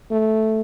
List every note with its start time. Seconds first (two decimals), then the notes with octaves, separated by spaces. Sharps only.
0.11 A3